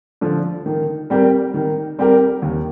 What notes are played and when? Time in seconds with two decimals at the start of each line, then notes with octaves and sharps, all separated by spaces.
0.21 D3 F3
0.66 D#3
1.10 G3 C4 G4 A#4
1.54 D#3
1.98 G3 C4 G4 A#4
2.42 D#2